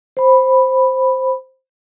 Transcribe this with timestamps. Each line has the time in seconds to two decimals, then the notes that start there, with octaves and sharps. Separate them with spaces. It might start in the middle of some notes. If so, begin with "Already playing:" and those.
0.17 C5 B5